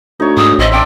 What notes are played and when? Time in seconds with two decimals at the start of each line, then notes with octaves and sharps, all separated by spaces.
0.20 D2 D#4 C#5
0.37 G#2 D#6
0.59 A1 C4 D#5 E5
0.72 C4 D4 G5